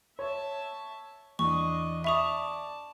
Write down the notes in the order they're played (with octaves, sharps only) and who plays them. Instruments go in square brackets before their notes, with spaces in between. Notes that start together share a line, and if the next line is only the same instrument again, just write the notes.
[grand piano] C#5 [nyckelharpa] E5 A5
[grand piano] E2 [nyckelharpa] D4 D#5 [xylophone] C#6
[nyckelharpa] D5 A5 [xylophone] E5 C#6 D#6 [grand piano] B5 F7